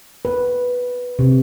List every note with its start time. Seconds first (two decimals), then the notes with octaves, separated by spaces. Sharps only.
0.25 B4
1.19 C3